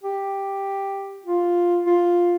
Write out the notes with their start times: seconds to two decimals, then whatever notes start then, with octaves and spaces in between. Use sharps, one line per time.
0.03 G4
1.25 F4
1.86 F4